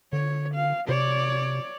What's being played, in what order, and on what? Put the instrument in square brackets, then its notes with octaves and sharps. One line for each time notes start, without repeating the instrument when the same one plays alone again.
[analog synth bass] D3 [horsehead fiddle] C#5
[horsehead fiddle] F5
[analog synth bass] C3 [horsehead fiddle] C#5 D5